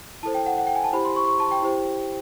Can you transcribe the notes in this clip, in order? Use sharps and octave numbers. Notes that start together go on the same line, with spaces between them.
E4 A4 C5 A5
G5
F#5
F#5
G5
G#5
A5
E4 G4 C5 B5
C6
C#6
C#6
A5
G5
E4 G4 C5